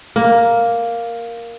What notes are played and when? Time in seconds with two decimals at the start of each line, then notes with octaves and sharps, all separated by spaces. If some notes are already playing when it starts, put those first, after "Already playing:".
0.16 A#3